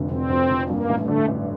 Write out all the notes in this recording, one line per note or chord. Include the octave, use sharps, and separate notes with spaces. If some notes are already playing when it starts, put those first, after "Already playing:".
Already playing: F1 F2 D3
F1 C4
F2
F1
G2 A#3
A1
A3
D3
A1